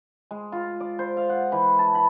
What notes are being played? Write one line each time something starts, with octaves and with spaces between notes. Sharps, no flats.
G#3
F4
D5
C5
F5
F#5
E3
A5
B5